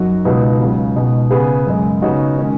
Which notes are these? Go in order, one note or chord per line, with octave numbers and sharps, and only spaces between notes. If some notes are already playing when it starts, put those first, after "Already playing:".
Already playing: F#2 F#3 D#4 F#4
C#2 B2 B3 D#4 F#4
C#2 C#3 F#3
B2 G#3 D#4
C#3 B3 G#4 B4
F#2 C#3 G#3
C#3 B3 D#4 F#4 C#5
D#3 G#3 C#4